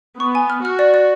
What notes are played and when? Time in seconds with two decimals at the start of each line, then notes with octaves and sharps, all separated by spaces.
0.20 B3 C#6
0.35 G#5
0.50 F6
0.64 F#4 F6
0.79 D5
0.94 D5